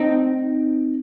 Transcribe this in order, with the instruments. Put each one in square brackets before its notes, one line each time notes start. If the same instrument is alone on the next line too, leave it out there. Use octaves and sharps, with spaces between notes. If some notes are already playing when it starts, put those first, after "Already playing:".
Already playing: [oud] C4 D#4